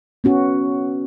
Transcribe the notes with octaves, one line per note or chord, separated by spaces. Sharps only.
B3 C#4 F#4